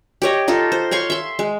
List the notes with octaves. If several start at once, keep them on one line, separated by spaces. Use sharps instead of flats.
G4 C#5 D#5
D#4 F4 A4
C5
C#5 F5 C6 C#6
E5 C6
G#3